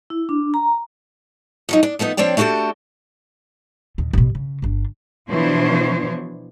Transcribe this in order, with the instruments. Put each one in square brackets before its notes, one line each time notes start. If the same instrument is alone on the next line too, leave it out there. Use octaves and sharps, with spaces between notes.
[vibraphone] E4
D4
A#5
[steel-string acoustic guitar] F3 F#3 D#4
D4
F3 A3 B3 D#4
F3 C4 D4 C#5 D5 G5
A3 D4 F#4 G4 A4
[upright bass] D#2 A#2
A1 B2
C#3
G1 D4
[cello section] B2 E3 F3 D4 C5 C#5